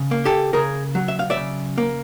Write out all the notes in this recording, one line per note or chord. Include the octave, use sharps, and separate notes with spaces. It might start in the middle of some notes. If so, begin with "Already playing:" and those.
Already playing: C#3
A#3
G4 A4
C#3 G#4 A#4
F#3
E5
F5
D5 E5
C#3
A#3